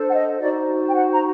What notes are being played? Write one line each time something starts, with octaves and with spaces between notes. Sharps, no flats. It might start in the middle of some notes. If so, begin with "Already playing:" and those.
Already playing: D4 A4 C5
F#5
D#5
D#4 F#4 C5 D5
G5
F#5
A#5